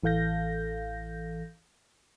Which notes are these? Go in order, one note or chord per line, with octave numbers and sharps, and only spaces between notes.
A1 E3 A4 F5 G6 A#6